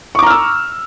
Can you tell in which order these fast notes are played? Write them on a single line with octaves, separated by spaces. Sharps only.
C#6 D6 A#5 F6 E6